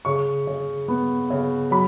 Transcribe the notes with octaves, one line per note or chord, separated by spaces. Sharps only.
C#3 C#6
C#3
B3
C#3
F#3 B5